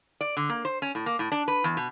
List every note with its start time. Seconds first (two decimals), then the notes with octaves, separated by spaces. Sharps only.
0.21 D5
0.37 D3
0.49 A#3
0.65 C5
0.82 C#4
0.95 A2
1.06 A#3
1.19 A2
1.32 D4
1.48 B4
1.64 E2
1.77 B2